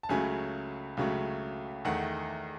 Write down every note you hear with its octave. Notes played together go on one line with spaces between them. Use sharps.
A5
C#2 C#3 F#3 A3 G#5
C#2 C#3 F#3 A3
E2 D#3 A3 F#5